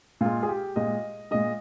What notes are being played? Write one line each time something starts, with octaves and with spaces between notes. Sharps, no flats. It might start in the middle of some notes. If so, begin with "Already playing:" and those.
A#2 G#3 F4
G#4
G4
A#2 G#3 D#5
A#2 G#3 D#5